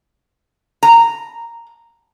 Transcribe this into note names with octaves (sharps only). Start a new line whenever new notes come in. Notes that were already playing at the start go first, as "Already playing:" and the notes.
A#5